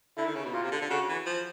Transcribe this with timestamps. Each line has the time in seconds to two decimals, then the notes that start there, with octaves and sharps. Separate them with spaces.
0.17 D3 E4
0.26 D#3
0.36 C#3
0.45 B2
0.54 A#2 F4
0.63 C3
0.72 D3
0.82 D3
0.90 C#3 F#4
1.08 E3
1.26 F3